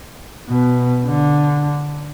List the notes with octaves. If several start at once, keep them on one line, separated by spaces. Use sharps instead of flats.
B2
D3